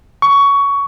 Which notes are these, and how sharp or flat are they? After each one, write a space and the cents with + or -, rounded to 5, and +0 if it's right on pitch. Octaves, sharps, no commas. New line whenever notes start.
C#6 +15